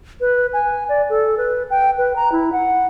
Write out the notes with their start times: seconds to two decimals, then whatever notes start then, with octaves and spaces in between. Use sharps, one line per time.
0.21 B4
0.53 G#5
0.89 D5
1.10 A4
1.38 B4
1.70 G5
1.98 B4
2.16 A#5
2.32 E4
2.52 F#5